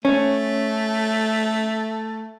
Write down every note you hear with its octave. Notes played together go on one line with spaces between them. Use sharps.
A3 C#4